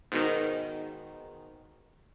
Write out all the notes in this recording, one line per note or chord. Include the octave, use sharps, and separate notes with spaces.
G#2 B2 D#3